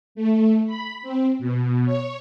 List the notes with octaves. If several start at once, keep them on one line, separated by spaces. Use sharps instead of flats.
A3
B5
C4
B2
C#5